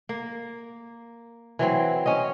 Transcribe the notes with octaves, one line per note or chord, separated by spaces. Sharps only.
A#3
E3 F#3 C4
C#4 D#5